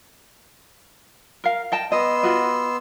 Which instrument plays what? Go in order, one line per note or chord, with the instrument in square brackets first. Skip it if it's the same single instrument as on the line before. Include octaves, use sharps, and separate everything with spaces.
[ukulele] A#4 F5
D#5 G5 A5
[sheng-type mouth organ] B3 C6 E6 [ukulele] D#5
[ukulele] F4 F#4 D#5